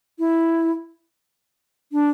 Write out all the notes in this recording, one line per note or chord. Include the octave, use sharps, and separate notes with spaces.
E4
D4